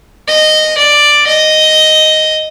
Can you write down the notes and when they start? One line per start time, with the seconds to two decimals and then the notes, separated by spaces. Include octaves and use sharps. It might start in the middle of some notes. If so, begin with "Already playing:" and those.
0.28 D#5
0.78 D5
1.27 D#5